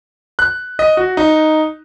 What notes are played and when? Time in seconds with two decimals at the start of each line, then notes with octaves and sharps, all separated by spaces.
0.39 F#6
0.79 D#5
0.97 F#4
1.17 D#4